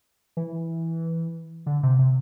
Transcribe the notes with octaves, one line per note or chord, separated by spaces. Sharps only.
E3
D3
C3
C3